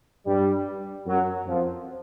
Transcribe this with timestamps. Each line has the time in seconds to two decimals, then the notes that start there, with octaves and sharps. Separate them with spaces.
0.26 G2 G3
1.06 F#2 F#3
1.46 F2 F3